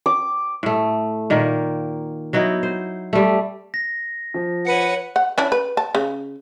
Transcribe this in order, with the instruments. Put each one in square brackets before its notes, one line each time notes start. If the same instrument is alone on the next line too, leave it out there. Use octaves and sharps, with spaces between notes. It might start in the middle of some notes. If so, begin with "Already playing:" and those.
[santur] D6
[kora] A2 A3
A#2 D#3 A#3
F#3 B3 D#4 E4
C5
G3 A3
[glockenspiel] A#6
[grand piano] F3
[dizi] B4 [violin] C#5 F#5 [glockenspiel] C#7 D#7
[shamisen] F#5
C#4 D4 E4
B4
A5
C#3